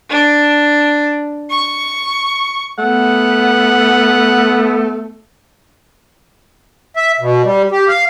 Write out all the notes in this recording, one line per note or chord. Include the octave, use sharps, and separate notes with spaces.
D4
C#6
A3 B3 F#5
E5
B2
G3
G4
F5